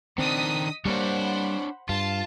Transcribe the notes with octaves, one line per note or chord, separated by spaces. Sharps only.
D#3 C4 D4 D#5 D#6 B6
G3 A#3 D4 C5 C#5 F#5 B5
G2 F4 A5